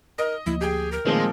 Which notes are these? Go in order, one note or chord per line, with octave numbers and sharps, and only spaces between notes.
A#4 D#5
D2 F3 A#3 E4
G4 G#4 G5
A#4
A#2 D#3 F3 G#3 A3 C4